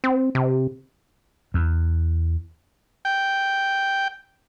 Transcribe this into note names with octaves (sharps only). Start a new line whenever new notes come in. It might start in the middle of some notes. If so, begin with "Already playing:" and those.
C4
C3
E2
G5